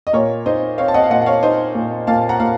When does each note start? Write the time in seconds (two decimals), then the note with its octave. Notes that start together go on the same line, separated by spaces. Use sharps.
0.07 D#5
0.13 A#2 A#4 C#5
0.46 D#4 C5 D#5
0.78 C4 C#5 F5
0.88 A5
0.94 D#5 F#5
1.04 F5
1.10 A#2 D#5 F#5
1.22 F#5
1.26 C#5 F5
1.43 D#4 C5 D#5
1.75 A#2
2.07 A#2 F5 A5
2.29 F#5 A#5
2.40 A#2 F5